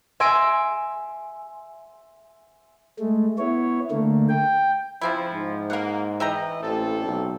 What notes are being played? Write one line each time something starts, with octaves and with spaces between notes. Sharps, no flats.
E5 G#5 C6 E6 A#6 D7
G#3 A3
B3 E4 C#5
D3 A3 A#3
G5
C#3 F3 C4 E4
G#2
A#3 A#4 F#5
E3 D#5 E5 G5 A#5
A1 A#2 C4 A4
B1